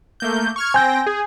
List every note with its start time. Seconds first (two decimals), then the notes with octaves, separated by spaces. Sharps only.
0.20 A3 A#3 G6
0.56 C#6 F6 G#6
0.74 C4 G5 G#5 G6 A#6
1.07 G#4